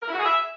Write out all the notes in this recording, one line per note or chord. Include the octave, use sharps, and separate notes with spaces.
A#4
E4
F#4
G#4
E5